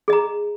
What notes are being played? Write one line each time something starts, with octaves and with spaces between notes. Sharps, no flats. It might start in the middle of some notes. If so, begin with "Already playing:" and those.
G#4 D#5 A#5